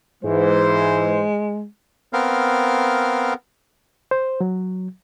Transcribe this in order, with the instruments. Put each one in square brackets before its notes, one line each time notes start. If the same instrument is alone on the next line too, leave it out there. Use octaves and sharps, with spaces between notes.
[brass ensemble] G#2 E3 C5 [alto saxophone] G#3
[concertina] B3 C4 A#4 F5
[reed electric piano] C5
F#3